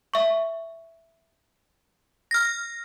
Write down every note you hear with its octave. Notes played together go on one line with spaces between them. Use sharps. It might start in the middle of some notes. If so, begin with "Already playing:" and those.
E5 C#6
F6 A#6